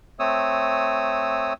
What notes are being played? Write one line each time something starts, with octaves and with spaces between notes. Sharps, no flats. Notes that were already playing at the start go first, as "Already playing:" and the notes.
A3 C4 C#5 D#6 E6